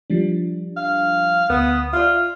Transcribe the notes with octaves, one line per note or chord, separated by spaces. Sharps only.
F3 G3 D4
F5
D2 B3 D#6
F4 D5 E5